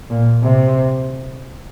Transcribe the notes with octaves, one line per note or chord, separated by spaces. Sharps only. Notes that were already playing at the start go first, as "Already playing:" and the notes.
A#2
C3